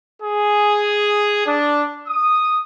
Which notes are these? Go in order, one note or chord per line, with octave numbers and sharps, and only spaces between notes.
G#4
D4
D#6